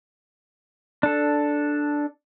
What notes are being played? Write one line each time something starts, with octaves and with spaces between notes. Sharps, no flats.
D4 A4